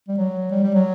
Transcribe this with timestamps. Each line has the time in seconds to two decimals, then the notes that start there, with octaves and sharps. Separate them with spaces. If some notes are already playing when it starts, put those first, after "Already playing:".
0.08 G3
0.18 F#3
0.51 G3
0.63 G3
0.74 F#3